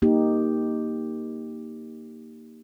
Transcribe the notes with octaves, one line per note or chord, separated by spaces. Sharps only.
A#3 D#4 G4